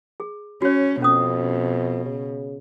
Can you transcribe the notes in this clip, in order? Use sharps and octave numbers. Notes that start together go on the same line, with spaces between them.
G#4
C#4 F#4 C#5
F2 B2 C#4 D#6
C#3